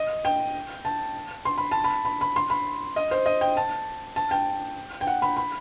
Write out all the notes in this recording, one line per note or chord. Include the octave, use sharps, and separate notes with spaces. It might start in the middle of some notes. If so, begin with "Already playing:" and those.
Already playing: D#5
G5
A5
C6
B5
A5
B5
B5
B5
C6
B5
D#5
C5
D#5
G5
A5
A5
G5
G5
F#5
B5
B5